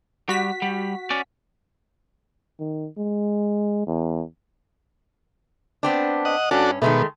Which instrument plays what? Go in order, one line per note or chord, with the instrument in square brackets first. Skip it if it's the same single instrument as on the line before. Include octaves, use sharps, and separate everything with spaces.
[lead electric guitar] G3 [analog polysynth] F#4 B6
[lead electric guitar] G3
C#4 D5
[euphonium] D#3
G#3
E2
[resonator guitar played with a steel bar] B3 C4 D4
[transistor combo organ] D#5 F#5
[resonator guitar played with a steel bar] G2 C#4 [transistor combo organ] D4 F#4 A4
[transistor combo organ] B2 [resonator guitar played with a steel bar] D#3 G#3 A3